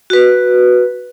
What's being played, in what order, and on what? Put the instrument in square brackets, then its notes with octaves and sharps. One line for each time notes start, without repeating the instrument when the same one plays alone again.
[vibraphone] F#4 B4